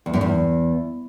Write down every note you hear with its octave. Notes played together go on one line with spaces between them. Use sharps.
E2
F#2
E2